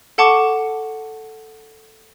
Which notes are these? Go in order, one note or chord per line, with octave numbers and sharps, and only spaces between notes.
A4 F#5 A5 C#6 D6